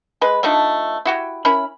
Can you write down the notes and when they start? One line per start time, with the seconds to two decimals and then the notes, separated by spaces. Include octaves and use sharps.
0.21 G#3 B4
0.43 F3 A3 D4 D#4
1.05 E4 F#4 G4
1.45 C#4 E4 A#4 B5